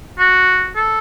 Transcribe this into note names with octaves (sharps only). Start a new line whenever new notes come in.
F#4
A4